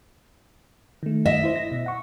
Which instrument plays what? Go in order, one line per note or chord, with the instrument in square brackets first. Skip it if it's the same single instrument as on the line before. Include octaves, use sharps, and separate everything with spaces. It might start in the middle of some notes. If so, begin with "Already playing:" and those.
[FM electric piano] D#3 A3
[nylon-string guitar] D#5 E5
[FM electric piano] E4 C5
A#6
B2
F#5 C#6